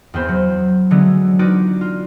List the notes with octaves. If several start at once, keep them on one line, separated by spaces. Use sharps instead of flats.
E2 B3 C4 C5 B5
F#3
D3 E3 F#3 G#3 A3 B3
D#4 F4 F#4 B4 D5
F4